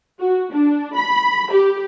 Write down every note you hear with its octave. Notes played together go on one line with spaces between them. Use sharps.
F#4
D4
B5
G4